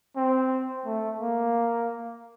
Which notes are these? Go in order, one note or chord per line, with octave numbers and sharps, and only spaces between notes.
C4
A3
A#3